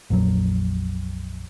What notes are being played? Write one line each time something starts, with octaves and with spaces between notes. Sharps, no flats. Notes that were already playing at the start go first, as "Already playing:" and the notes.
A#1 F2 A#2 F#3